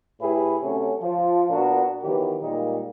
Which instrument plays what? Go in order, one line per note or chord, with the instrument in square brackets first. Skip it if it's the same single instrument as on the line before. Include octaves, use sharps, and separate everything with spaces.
[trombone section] A2 E4 G4 G#4 B4
C3 F#3 A3 C#4
F3
A#2 B3 D4 F#4 A#4
D#3 E3 F#3 B3 G4
A#2 G3 G#3 A#3 D#4